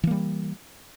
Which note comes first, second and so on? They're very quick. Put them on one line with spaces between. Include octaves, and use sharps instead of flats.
E3 A#3 G3